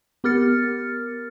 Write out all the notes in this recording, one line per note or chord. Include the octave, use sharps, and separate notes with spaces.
B3 G4 A#4 F6 A6 C#7